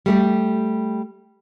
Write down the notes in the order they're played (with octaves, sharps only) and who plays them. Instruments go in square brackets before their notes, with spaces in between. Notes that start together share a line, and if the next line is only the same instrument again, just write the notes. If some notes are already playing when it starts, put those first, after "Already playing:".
[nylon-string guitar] G3 A3 G4